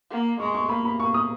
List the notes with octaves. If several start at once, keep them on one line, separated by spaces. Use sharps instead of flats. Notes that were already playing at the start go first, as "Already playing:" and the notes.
A#3
G#3 C#6
C#6
A#3 B5
B5
A#3 C#6
D#6